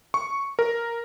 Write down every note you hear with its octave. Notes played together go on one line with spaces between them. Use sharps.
C#6
A#4